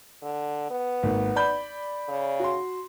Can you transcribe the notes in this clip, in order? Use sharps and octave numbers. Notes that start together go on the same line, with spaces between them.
D3
B3
G#1 A#3
D5 B5 G6
C#3
F#4 C6